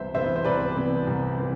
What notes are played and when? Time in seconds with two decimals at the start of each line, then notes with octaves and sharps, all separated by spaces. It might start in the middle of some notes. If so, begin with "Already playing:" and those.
Already playing: C2 C3 E3 B3 C5 E5
0.14 C3 E3 B3 C5 E5
0.36 C5
0.45 C2 B4 D5
0.76 C3 E3 B3
1.07 C2
1.38 C3 E3